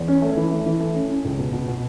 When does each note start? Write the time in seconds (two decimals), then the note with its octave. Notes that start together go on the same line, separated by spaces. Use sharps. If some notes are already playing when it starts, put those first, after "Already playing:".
Already playing: E2
0.08 C#4
0.22 A3
0.37 E3
0.51 A3
0.66 E3
0.80 A3
0.95 C#4
1.09 C#4
1.25 C#2
1.39 B2
1.53 B2
1.68 B2